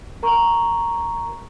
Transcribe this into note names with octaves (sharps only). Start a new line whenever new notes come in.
A#4 A#5 C#6